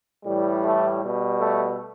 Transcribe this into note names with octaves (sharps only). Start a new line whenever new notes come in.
A2 E3 G3
A3
B2 G3
A3